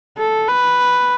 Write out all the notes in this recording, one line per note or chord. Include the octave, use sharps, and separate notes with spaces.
A4
B4